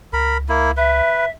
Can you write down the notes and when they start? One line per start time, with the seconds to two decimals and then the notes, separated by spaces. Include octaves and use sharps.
0.13 C#2 A#4 B5
0.49 A#3 E4
0.77 B4 E5